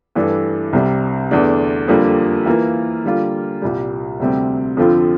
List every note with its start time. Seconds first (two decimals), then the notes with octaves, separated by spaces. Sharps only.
0.15 G2 E3 A3 D4 A4
0.73 C2 C3 G3
1.31 E2 D3 A3 D4
1.88 F2 D3 G3 A#3
2.46 E3 A#3 F4 A#4
3.04 D3 G3 A#3 F4
3.62 C2 A#2 G3
4.20 D2 C3 G3 C4
4.77 F2 D3 F3 C4 F4